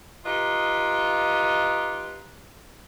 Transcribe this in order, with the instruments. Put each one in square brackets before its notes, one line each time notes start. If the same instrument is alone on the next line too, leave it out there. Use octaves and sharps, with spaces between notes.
[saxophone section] D#4 F4 G4 B4 D#5